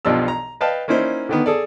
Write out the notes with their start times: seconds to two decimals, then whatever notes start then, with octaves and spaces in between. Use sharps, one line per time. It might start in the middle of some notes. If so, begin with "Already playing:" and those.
0.05 B1 B2 F3 D4 G4 E6
0.28 A#5
0.61 B4 D#5 F5 G5 A5
0.88 A#3 C#4 D#4 E4 C5 D5
1.29 D3 D#3 B3
1.46 G#4 A4 D5